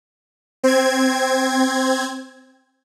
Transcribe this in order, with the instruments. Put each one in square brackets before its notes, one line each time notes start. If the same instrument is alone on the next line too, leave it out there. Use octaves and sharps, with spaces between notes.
[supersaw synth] C4 G#6